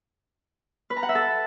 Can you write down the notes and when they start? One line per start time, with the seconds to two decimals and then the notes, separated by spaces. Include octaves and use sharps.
0.90 B4
0.97 A#5
1.03 F#5
1.09 E5
1.15 A4